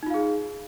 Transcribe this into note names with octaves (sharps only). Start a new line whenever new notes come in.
D#4 F4 G#4 F5